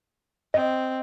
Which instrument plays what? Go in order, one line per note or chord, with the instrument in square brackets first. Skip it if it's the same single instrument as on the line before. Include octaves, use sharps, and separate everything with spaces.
[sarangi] C4 [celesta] D#5